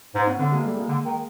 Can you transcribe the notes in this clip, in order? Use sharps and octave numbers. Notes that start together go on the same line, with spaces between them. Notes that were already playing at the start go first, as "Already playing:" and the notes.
G#2
B3 C#4
D3 A3 B3
G#3 A#3
G3 A3
G#3 A#3
D3
D#3